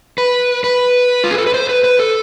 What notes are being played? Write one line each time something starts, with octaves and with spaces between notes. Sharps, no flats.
B4
B4
F4
G#4
A4
B4
C5
B4
B4
A4